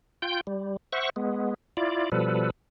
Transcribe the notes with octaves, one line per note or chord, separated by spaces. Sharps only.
F4 G5 G6
G3
C5 E5 F#5 C#6
G#3 B3
E4 F4 D5
B2 F3 G3 A4 B4